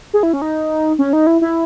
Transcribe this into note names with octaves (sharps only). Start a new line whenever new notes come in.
G#4
E4
C#4
D#4
C#4
D#4
E4
E4